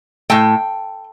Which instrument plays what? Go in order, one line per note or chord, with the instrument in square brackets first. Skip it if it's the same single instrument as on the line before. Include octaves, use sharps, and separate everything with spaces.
[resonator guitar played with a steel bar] A2 A3 G5